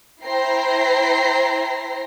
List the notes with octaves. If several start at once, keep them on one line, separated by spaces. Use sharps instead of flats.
E4 C5 G5 A#5 A#6 C7